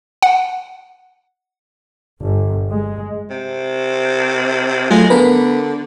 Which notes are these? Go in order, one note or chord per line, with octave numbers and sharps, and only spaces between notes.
F#5
G1
G#3
C3
F#3 G#3 A3 F4
D3 B3 A#4 B4